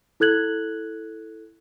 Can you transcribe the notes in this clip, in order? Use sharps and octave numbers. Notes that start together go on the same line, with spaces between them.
E4 A4 F#6 G#6 F#7